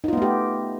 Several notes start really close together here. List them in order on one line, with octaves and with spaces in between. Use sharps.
D#4 F4 B3 A3 G4